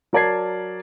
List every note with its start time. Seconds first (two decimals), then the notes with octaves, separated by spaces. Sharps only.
0.13 F#3 A#4 D5 A5 G#6 C7